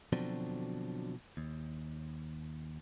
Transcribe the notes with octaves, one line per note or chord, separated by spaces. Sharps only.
B2 D3 F3 F#3 C4 D4
D#2